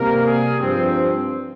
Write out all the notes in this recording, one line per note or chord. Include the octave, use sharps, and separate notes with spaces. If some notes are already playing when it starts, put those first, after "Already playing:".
Already playing: C3 G3 A#3 A#4
G#4
G2 F3 C4